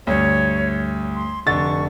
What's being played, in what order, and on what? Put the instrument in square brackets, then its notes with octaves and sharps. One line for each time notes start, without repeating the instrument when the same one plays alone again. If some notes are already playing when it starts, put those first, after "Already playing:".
[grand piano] D2 G2 [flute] C#5
[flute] C6
[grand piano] F1 D3 A6 [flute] C#6